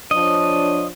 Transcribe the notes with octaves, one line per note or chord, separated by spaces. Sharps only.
F3 D4 C#5 D#5